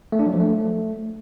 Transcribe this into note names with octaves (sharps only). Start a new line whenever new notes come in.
A3
D4
F#3
F3
A3